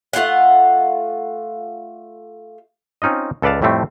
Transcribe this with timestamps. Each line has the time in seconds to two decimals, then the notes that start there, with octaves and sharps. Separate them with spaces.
0.13 A3 F4 F5 F#5
3.02 C4 C#4 D#4 F4 D#5
3.42 C#2 A4 B4 D5 F5 A5
3.62 F2 A2 G3 A3 C4